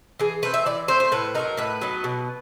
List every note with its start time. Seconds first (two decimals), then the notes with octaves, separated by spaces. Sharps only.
0.20 E3 G#4
0.42 A3 C4 B4
0.54 E5
0.66 E3 D5
0.88 A3 C4 C5
1.00 C5
1.12 A2 B4
1.35 F#3 B3 D#4 A#4
1.57 A2 B4
1.81 F#3 B3 D#4
2.04 B2